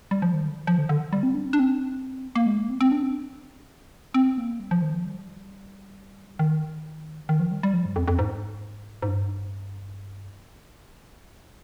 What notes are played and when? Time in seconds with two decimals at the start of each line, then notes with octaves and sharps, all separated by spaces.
0.11 G3
0.22 F3
0.34 D#3
0.45 D3
0.56 D#3
0.67 F3
0.78 D3
0.89 D3
1.13 G3
1.23 C4
1.34 D4
1.46 C4
1.53 D4
1.59 C4
2.35 A#3
2.46 G#3
2.58 A#3
2.70 C4
2.81 C4
2.92 D4
3.03 C4
4.14 C4
4.38 A#3
4.60 G3
4.71 F3
4.82 D#3
4.93 F3
5.05 G3
6.39 D#3
7.29 D#3
7.40 F3
7.51 G3
7.63 G3
7.73 F3
7.85 G2
7.96 F2
8.08 F2
8.19 G#2
9.02 G#2
9.08 G2